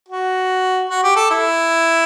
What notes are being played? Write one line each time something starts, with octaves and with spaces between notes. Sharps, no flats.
F#4
F#4
G4
A4
E4